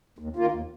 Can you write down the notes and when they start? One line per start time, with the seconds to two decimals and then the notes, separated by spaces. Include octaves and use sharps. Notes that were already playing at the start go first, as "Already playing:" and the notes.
0.19 D#2
0.36 D#3 A#3 F4
0.52 D#2